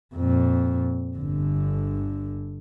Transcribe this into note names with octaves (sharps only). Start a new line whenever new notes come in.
F2 A#2
G1 D3